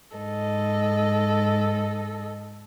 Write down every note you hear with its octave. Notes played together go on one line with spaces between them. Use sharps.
G#2 A4 D#5